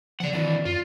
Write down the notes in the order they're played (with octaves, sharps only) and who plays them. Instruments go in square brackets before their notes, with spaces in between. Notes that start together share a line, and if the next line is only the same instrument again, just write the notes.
[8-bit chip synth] C#3 F3 [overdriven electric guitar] D5 F#5
[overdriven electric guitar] C3 E3 [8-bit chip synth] D#3 [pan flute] D5
[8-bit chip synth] F#2 [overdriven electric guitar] F4